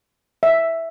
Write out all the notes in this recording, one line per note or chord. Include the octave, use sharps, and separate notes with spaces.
E5